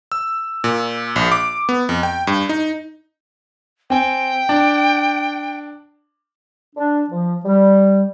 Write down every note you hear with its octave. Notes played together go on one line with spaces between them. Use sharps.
E6
A#2
A#1
D6
B3
F2
G5
G2
D#4
C4 G5 G#5
D4
D4
F3
G3